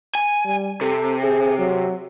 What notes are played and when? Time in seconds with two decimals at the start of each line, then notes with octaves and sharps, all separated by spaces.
0.15 G#5
0.45 G3
0.81 C3 A4
1.24 G#4
1.59 F#3